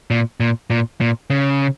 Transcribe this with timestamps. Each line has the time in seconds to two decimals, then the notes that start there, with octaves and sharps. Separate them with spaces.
0.11 A#2
0.40 A#2
0.70 A#2
1.01 A#2
1.30 C#3